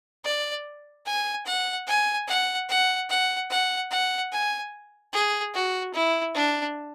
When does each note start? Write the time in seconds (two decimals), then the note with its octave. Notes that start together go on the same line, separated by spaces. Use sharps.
0.24 D5
1.06 G#5
1.46 F#5
1.87 G#5
2.28 F#5
2.69 F#5
3.09 F#5
3.50 F#5
3.91 F#5
4.32 G#5
5.13 G#4
5.54 F#4
5.94 E4
6.35 D4